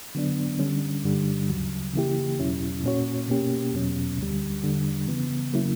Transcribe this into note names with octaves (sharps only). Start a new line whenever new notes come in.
D3 F#3 B3 D4
D3 G3 C#4
G2 D3 G3
D2 C#3 F#3
C#3 E3 A#3 E4 G4
E2 B2 F#3 C#4 E4
A#2 A#3 C#4 F#4 C#5
B2 A#3 C#4 G4
E2 B2 F#3 C#4
D2 D3 G3
E2 D3 G3
C#3 E3 B3
C#3 F#3 A#3 C#4 E4